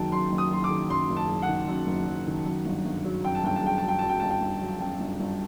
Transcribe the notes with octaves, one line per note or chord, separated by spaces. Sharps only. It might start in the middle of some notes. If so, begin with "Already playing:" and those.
Already playing: F#1 F#2 D#3 F#3 G5 A5
F#2 C6
F#1
D#6
F#3 C6
D6
D#3
F#2 C6
F#1
A5
F#3
F#5
D#3
F#2
F#1
F#3
D#3
F#2
G1
G1
F#3
F#2 G5
A5
G1 G5
A5
G1 G5
A5
F#3
G5
F#2 A5
G5
G1 A5
G5
G1
F#3
F#2 G5
G1
G1